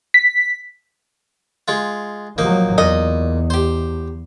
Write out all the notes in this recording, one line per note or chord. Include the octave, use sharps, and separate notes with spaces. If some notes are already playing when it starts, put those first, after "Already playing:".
B6
G#3 F4
F3 F#3 A#3 D#4
E2 A#2 D#5
G4 C5